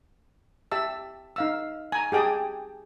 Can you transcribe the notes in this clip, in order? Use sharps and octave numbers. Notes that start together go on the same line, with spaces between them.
G4 E5 A5 E6
D#4 F5 E6
G#5 A#5
G4 G#4 G5 A5 D#6